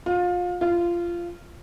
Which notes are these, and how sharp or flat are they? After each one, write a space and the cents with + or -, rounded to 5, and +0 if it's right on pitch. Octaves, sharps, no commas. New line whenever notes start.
F4 +30
F4 -15